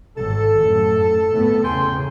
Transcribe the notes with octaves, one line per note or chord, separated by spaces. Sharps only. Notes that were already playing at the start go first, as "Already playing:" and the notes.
G#1 A4
F#2 A2
A2 C3 B3
E2 C#3 G5 G#5 C6